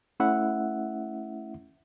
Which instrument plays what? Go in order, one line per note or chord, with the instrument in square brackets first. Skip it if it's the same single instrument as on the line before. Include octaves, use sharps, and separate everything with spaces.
[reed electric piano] A3 C#4 E4 E5 F#5